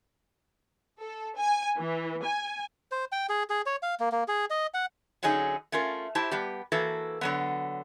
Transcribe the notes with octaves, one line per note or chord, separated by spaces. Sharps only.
A4
G#5
E3
G#5
C5
G5
G#4
G#4
C#5
F5
A#3
A#3
G#4
D#5
F#5
D3 F#3 C#4 D#4 G#4
A3 C#4 F4 A#4
E4 G4 C5 A5
G3 B3 G4
E3 A#3 F#4 A4 B4
D3 F#3 B3